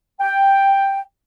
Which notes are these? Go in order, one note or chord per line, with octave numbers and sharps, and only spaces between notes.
G5